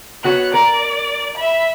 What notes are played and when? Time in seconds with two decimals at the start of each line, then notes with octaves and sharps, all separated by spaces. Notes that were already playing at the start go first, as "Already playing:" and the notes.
0.24 B3 F#4 C#5 F#6
0.54 A#4 D5
1.37 E5 B5